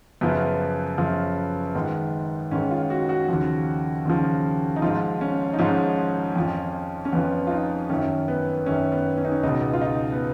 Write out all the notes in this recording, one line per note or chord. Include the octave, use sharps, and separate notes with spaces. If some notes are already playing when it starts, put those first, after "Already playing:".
F#2 C#3 F3 B3
F#2 C#3 F3
G#2 D#3
G#2 D#3 C#4
F4
F#4
F#4
D#2 C#3 F3
D#2 C#3 F3
D#4
G#2 F3 F4
C#4
D#4
G#2 F3 C#4
F2 F3
C#4
F2 F3 B3
F4
D#4
F#2 D#3 C#4
B3
F#2 D#3 C#4
B3
C#4
D#4
C#4
C#2 B2 D#4
F4
D#4
B3